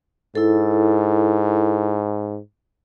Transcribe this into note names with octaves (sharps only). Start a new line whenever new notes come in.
G#2 E4 A4